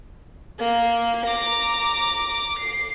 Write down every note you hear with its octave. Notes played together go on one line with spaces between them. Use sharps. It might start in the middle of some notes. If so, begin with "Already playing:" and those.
A#3
A#5 D6
C7